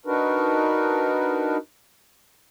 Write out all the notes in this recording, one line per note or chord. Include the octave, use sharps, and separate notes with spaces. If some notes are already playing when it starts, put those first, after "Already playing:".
D4 D#4 F#4 A#4 B4